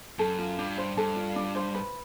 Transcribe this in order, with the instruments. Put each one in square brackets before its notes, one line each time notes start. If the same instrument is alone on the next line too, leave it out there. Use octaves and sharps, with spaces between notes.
[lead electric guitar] F#2 [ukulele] A4
[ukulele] F4
[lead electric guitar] G2 [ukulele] D4
[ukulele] C5
[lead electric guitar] G2 [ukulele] A4
[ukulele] F4
D4
C5
B4